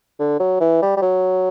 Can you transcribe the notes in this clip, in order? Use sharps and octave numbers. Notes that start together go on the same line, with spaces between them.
D3
F#3
E3
G3
G3
F#3